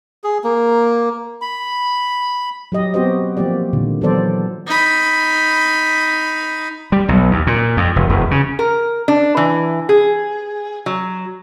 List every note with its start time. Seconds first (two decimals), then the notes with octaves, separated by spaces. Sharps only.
0.24 G#4
0.44 A#3
1.41 B5
2.72 F#3 G4 D#5
2.94 B3 C4 F#4 G4 C5 D#5
3.37 F3 A#3 C4 G4 D5
3.73 A#2 D3 D#3
4.01 E3 F#3 B3 A4 C5 D5
4.67 D#4 B5
6.92 G3
7.08 B1
7.31 D#2
7.47 A#2
7.77 F2
7.96 F1
8.09 E1
8.31 C#3
8.59 A#4
9.08 D4
9.37 E3
9.89 G#4
10.86 F#3